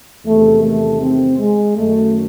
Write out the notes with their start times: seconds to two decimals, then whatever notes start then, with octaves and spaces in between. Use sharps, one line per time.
0.24 E2 C3 D#3 A3
0.63 A3
1.01 C4
1.38 G#3
1.76 F#2 D#3 A3